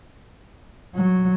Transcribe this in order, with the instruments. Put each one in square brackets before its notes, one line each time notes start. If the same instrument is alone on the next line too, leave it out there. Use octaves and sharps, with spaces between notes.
[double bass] F#3